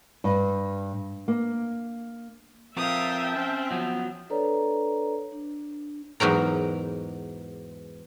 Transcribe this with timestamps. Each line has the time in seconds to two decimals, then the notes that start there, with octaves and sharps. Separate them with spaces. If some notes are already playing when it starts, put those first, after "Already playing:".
0.24 G2
1.28 A#3
2.76 F3 C4 A#4 E5 F5 G5 A5 D#6
3.35 C4 C#4
3.71 F3 F#3 B3
4.30 D4 A4 B4 C#5 D5 A#5
5.32 D4
6.20 E2 G#2 F#3 A#4